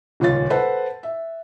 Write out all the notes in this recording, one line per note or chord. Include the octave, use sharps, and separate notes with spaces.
D#1 C#2 C#4 F4 A6
A4 B4 C5 F#5 A5
E5